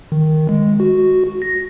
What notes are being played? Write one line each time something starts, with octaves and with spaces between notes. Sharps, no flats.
D#3
G#3
F#4
A#6